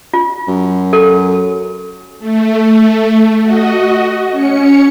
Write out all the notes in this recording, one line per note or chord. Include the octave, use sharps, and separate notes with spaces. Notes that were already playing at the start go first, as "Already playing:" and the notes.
F4
F#2
A4
A3
F#4 D#5
C#4 C#7